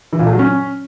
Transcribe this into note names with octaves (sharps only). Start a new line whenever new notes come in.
E3
A#2
A3
F#3
C#4